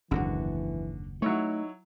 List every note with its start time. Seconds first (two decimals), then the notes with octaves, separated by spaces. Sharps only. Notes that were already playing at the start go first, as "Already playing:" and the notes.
0.11 F#1 D#2 G#2 D3 E3 F#4
1.22 F#3 A3 D#4 E4 C#5